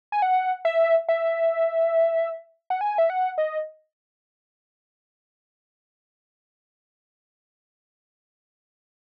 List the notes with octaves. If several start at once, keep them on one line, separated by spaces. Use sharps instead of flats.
G#5
F#5
E5
E5
F#5
G#5
E5
F#5
D#5